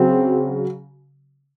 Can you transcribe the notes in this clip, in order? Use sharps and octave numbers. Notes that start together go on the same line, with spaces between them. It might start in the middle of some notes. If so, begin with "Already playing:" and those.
Already playing: C#3 F#3 C4